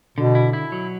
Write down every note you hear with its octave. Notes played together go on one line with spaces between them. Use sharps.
B2 D3
E4
E4
F#3